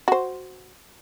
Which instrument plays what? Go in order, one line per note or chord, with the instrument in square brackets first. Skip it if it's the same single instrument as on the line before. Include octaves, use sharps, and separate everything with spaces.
[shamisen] F#4 C5